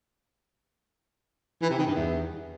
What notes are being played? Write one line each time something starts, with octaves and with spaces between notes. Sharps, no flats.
E3
C3
D#3
G2
E2